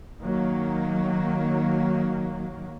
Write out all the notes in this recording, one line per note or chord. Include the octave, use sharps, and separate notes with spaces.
D#3 F#3 A#3